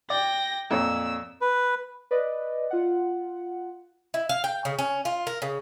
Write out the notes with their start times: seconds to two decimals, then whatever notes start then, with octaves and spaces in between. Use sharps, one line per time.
0.10 D5 G5 A#6
0.71 F2 A#2 C#5 E6
1.41 B4
2.11 B4 D5 D#5
2.70 F4 F#5
4.14 E4
4.29 F5
4.44 G5
4.65 C#3
4.79 C#4
5.05 F4
5.27 A#4
5.42 C#3